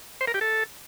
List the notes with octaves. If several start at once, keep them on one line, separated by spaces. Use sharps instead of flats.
C5
A#4
G4
A4